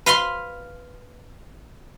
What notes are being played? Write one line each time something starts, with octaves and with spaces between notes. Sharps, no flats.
B4 F5 B5 C6